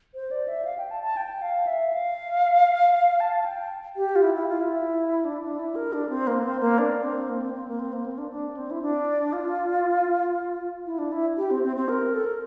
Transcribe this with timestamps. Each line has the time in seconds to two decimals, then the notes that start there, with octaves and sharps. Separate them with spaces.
0.15 C5
0.31 D5
0.48 E5
0.65 F5
0.78 G5
0.91 A5
1.03 A5
1.17 G5
1.42 F5
1.67 E5
1.93 F5
3.20 A5
3.45 G5
3.96 G4
4.16 F4
4.22 E4
4.35 E4
4.48 F4
4.61 E4
5.25 D4
5.42 D4
5.59 E4
5.75 A#4
5.93 D4
6.09 C4
6.27 A#3
6.43 C4
6.60 A#3
6.78 D4
7.03 C4
7.29 A#3
7.42 C4
7.54 C4
7.68 A#3
7.80 C4
7.93 A#3
8.06 C4
8.18 D4
8.31 D4
8.57 C4
8.71 E4
8.82 D4
9.33 F4
10.86 E4
10.99 D4
11.12 E4
11.37 G4
11.51 C4
11.63 C4
11.76 C4
11.89 A#4
12.14 A4
12.25 A#4